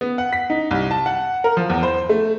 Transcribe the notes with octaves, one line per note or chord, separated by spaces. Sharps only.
B3
F#5
B6
D#4
C2
A5
F#5
A#4
F3
E2
C5
A3